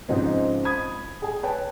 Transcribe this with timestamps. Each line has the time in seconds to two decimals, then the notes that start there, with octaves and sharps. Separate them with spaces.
0.08 G#2 C#3 F3 G#3 C4 D#4
0.65 B5 D#6 G#6
1.22 G#4 G#5
1.43 B4 C#5 G5 A5